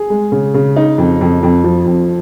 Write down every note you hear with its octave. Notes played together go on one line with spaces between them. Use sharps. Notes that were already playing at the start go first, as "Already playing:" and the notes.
Already playing: G#4
G#3
C#3
C#3
D#4
F2
F2
F2
F3
F2